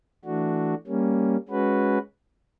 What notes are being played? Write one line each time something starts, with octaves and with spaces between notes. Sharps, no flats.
E3 A3 D4 F#4
G3 A#3 C#4
G#3 C#4 F#4 B4